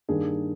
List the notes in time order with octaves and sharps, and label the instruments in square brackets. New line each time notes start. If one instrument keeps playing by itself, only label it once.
[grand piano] G2 D#3 G3 A#3 D4 G#4